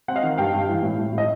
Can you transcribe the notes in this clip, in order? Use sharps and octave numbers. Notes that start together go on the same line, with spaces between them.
C4 F#5
D#5 F5
D#3
G2 F5 G5
G2
E3
A2
A2
A2
D#5